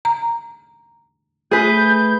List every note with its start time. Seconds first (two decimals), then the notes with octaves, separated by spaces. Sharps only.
0.05 A#5
1.51 A3 G#4 B4 G6